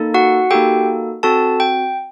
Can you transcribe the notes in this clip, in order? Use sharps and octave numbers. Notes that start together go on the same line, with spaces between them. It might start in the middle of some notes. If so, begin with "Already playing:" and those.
Already playing: A#3 D#4 A4
F#4 F#5
A#3 D#4 F#4 G4 A4 G5
C4 F#4 A4 A5
G5